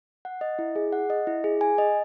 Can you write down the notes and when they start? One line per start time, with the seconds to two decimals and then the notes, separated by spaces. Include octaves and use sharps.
0.25 F#5
0.41 D#5
0.59 E4
0.76 G#4
0.93 F#5
1.10 D#5
1.27 E4
1.44 G#4
1.61 G#5
1.78 D#5